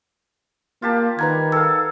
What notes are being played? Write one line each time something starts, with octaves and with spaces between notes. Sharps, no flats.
A#3 F4 G4 A5
D#3 G3 B4 F#5 A#5 G#6
A4 F5 E6